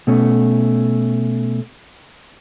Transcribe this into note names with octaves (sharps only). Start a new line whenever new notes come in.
B2 A3 C#4